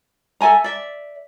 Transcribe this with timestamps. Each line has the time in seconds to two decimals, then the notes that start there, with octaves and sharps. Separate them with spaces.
0.41 A4 E5 G#5 A#5
0.64 D5 E5